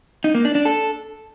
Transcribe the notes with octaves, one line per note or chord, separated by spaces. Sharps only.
D#4
A#3
D4
D4
A4